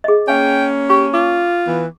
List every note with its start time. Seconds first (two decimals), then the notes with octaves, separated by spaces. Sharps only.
0.04 G#4 D#5
0.28 A#3 C#4 F5 G5 G#5
0.90 G4 C#6
1.14 F4 D6
1.67 E3 B3